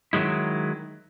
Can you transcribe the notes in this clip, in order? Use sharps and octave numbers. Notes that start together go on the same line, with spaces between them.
D#3 F#3 G#3 E4